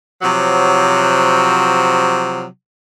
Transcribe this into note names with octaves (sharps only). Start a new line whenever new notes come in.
C3 F3 F#3